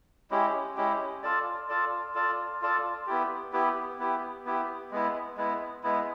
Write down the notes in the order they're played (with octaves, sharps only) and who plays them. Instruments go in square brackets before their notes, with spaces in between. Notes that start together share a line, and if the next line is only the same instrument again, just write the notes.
[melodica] G#3 C#4 E4 G4
G#3 C#4 E4 G4
F4 A4 D5
F4 A4 D5
F4 A4 D5
F4 A4 D5
B3 E4 G4
B3 E4 G4
B3 E4 G4
B3 E4 G4
G#3 B3 E4
G#3 B3 E4
G#3 B3 E4